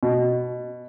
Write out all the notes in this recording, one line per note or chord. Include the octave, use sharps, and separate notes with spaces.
B2